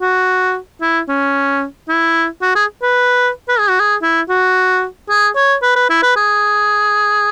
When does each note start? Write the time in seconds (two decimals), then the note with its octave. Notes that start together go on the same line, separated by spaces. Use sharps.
0.01 F#4
0.81 E4
1.09 C#4
1.89 E4
2.42 F#4
2.55 G#4
2.83 B4
3.49 B4
3.59 G#4
3.69 F#4
3.80 G#4
4.02 E4
4.29 F#4
5.09 G#4
5.36 C#5
5.63 B4
5.76 B4
5.90 E4
6.03 B4
6.16 G#4